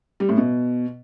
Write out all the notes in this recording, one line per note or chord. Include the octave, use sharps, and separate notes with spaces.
G3
A2
B2